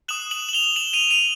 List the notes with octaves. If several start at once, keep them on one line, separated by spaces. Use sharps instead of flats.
D#6 F#6 E7 F#7
E7 F#7
F#7
F7 G7
E7 F#7
D#7 F7
D#7 F7